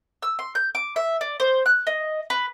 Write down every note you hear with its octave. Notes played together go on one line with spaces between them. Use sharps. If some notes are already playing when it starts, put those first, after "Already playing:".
E6
C6
G6
D6
E5
D5
C5
F#6
D#5
B4